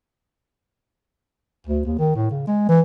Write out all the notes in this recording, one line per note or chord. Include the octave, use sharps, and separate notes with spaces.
D2
D#2
D#3
A2
C#3
G#3
E3